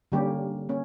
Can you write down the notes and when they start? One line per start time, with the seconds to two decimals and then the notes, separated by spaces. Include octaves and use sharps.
0.12 D3 G3 A#3 C#4 G4
0.69 A#3 C#4